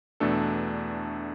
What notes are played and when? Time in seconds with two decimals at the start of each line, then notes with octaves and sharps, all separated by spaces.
0.20 E2 B2 A3 D4 A4